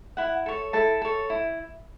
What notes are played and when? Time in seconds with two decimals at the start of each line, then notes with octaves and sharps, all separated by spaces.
0.17 E4 F#5
0.46 A4 C#5
0.73 E4 A4 A5
1.02 A4 C#5
1.30 E4